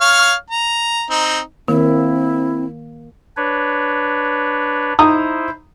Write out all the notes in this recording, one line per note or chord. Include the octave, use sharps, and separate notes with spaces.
C#5 F5 F6
A#5
C4 D#4
D#3 A#3 C4 E4
D4 B4 C#5
D#4 E4 C5 A#5 D#6